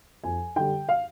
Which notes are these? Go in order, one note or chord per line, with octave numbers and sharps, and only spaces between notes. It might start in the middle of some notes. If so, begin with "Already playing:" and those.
F2 G#5
D3 G3 G5
F5